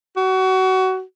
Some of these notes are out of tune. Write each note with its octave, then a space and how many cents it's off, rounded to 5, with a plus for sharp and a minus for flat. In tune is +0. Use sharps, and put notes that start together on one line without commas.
F#4 +25